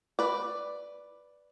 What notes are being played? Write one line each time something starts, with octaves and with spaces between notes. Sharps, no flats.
B4 D5